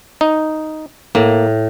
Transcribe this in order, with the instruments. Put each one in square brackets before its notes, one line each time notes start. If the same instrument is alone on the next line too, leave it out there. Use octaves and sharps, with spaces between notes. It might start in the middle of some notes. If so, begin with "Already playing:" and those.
[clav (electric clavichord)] D#4
[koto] A2 [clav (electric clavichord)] A#3